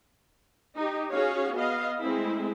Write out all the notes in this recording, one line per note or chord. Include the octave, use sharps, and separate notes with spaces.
D#4 G4
C#4 F#4 G#4 C#5 F5
B3 D#5 F5
G#3 A3 C4 E4 G#4